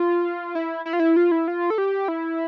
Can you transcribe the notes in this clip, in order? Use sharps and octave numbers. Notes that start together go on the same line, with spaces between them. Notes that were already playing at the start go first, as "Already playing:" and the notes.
Already playing: F4
E4
E4
F4
E4
F4
E4
F4
A4
G4
E4